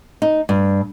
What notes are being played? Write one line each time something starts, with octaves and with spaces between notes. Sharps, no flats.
D#4
G2